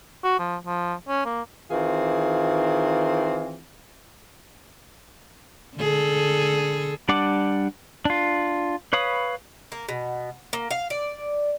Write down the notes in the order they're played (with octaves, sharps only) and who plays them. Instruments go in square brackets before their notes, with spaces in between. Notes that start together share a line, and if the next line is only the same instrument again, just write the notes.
[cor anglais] F#4
F3
F3
C#4
A#3
[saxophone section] D#3 E3 C4 F4 G#4
[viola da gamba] D3 G#4 A4
[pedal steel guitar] G3 D4 D5 F#5 D6
D4 F4
B4 C#5 F5 B5 D#6
[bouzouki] A#3
B2
A#3
F5
D5